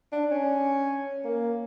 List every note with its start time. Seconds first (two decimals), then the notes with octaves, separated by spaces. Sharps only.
0.12 D4
0.31 C#4
1.24 A#3